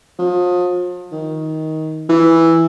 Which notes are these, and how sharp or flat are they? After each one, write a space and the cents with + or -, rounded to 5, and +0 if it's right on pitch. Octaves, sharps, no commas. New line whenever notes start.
F3 +35
D#3 +15
E3 +0